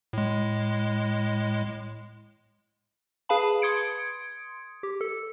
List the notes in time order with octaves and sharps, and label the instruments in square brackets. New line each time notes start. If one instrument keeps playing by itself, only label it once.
[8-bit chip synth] A2 G#3
[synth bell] G#4 B4 F5 A5 B5
C6 D#6 G#6 C#7 D7
G4
A4